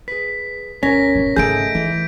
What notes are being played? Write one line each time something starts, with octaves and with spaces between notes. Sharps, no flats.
G#4 B4 B6
D2 B2 G3 C#4 A#4 A#6 B6
F1 G#2
G#1 C#3 A3 D#4 G#4 G6 D7
E3 E4